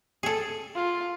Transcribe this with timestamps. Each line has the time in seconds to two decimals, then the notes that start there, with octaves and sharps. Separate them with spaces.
0.23 G#4 A4
0.76 F4